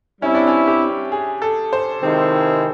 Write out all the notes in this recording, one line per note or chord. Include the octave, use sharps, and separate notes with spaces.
G3 C4 C#4 E4
D4
C#4
G4
G#4
A4
C5
C3 D#3 G#3 C4 E4